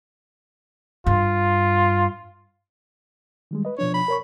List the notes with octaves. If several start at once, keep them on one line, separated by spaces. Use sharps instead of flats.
G2 F4
D#3 G3 G#3
B4 D#5
B2 F3 D4 C#5
B5
A#4 C#5 C#6